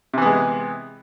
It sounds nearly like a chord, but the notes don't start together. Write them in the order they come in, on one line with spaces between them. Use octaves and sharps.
C3 E3 B3 G#3